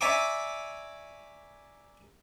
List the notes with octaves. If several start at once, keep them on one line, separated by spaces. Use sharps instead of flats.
D5 E5 G#5 A#5 C#6 D6